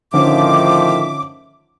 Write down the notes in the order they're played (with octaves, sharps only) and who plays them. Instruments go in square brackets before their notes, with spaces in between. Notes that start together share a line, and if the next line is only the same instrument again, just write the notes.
[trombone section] A2 D#3 F3 [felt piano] D3 C#4 D#4 [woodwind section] E5 D6